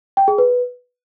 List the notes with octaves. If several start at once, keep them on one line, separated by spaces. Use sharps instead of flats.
G5
G#4
B4